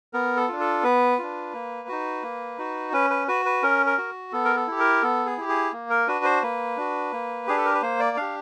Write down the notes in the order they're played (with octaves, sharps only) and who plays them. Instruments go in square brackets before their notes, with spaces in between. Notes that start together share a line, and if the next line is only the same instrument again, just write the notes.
[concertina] B3 A#4
A4
D4 F4
A4
B3 B4
D4 F4
A#3
D#4 F#4
A#3
D#4 F#4
C#4 B4
B4
F#4 B4
B4
C#4 A#4
A#4
F#4
B3 A4
A#4
A4
E4 G4
A#4
B3 A4
G#4
E4 G4
G#4
A#3
A#4
D4 F#4 B4
C5
A#3 B4
D4 F#4
A#3
D4 G4 G#4
A4
A#4
B4
A#3 C5
D5
D4 G4 F5